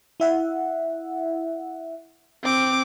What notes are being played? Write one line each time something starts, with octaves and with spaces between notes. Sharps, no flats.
E4 E5 F#5
C4 D6